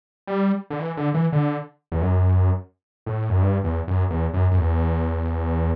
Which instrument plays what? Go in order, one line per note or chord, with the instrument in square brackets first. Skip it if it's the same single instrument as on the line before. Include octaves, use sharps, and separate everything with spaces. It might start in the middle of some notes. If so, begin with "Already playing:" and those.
[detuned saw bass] G3
D3
E3
D3
E3
D3
E2
F#2
A2
F#2
G2
E2
F#2
E2
F#2
F#2
E2